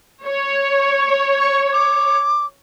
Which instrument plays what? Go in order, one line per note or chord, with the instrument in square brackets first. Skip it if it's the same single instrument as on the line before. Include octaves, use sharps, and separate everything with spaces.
[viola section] C#5
[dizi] C#6
D6